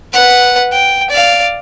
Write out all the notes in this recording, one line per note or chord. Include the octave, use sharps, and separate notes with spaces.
B4 F#5
G5
D5 F5